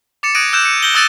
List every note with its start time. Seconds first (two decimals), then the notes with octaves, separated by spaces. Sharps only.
0.23 D6 A6 C#7 E7
0.35 D#6 F#6 G#6 A#6 D7 D#7
0.53 E6 F#6 G6 E7
0.65 C#7
0.83 E6 G6 A#6 F#7 G7
0.95 D#6 E6 F#6 A6 D7 D#7